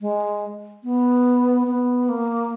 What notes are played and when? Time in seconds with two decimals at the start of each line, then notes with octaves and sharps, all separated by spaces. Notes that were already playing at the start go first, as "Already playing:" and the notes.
0.01 G#3
0.84 B3
1.67 B3
2.09 A#3